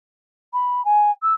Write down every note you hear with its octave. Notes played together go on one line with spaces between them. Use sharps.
B5
G#5
E6